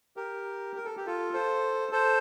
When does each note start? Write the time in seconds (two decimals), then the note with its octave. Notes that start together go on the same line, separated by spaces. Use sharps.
0.17 G4 A#4
0.76 A#4
0.85 A4
0.97 G4
1.07 F4 A4
1.34 A4 C5
1.92 A4 C5